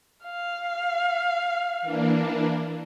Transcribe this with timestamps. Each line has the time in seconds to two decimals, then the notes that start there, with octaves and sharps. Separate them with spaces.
0.24 F5
1.82 E3 A#3 D4